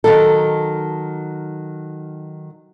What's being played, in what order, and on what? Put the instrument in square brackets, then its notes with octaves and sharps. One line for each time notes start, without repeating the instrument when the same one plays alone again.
[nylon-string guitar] D#3 F#3 A4